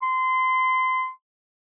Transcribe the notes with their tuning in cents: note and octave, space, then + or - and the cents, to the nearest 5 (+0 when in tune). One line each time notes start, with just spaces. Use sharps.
C6 -25